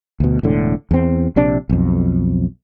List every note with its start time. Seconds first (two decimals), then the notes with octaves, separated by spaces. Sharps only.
0.20 D2 B2
0.43 E1 A2 D3
0.91 E2 C4
1.36 A#1 C3 D4
1.69 B1 F2